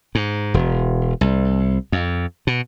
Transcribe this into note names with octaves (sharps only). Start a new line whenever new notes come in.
G#2
E1
C2
F2
B2